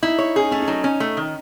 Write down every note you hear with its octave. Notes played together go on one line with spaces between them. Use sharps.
D#4 E4
C#5
C#4 G#4
D#4
A3 C#4
C#4
F#3 D#4
C#4
A3
D#3